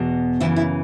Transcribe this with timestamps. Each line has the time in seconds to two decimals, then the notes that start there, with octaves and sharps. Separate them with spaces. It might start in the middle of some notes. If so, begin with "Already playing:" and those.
Already playing: E2 B2
0.40 F#2 C#3 E3 E4
0.56 E4